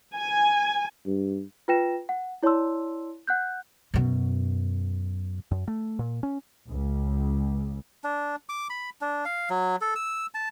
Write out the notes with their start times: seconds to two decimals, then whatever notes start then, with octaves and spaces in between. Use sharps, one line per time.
0.15 G#5
1.06 G2
1.68 F4 B4 G5 A#6 E7
2.09 F#5
2.43 E4 C#5 D5 A5 C6 E6
3.27 F#5 F#6 G6
3.94 F#2 B2
5.51 F#2
5.68 A3
5.99 A#2
6.23 C#4
6.69 C#2
8.04 D4
8.49 D6
8.70 B5
9.01 D4
9.25 F5
9.50 F#3
9.81 A4
9.96 E6
10.34 A5